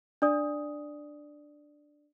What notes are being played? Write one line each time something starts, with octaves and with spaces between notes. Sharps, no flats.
D4 D5 D#6